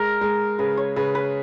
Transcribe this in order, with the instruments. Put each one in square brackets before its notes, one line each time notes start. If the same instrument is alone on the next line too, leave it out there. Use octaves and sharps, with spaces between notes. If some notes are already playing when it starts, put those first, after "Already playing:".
Already playing: [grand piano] G#3 [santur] A#4
[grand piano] G#3
[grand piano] C#3 [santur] B4
[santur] C#5
[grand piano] C#3 [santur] B4
[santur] B4